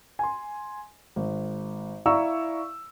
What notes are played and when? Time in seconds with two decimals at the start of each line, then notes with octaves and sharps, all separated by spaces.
0.19 G#5 C6
1.16 G#1
2.06 E4 D5 F5 A#5 C#6 E6